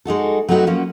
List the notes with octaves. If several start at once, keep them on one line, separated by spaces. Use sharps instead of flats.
G#3 D#4 F#4 A4
F#3 A3 C4 D#4 F#4 B4
F3 F#3 A#3 C#4